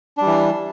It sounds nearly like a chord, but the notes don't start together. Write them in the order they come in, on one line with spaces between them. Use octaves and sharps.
D4 G3 E3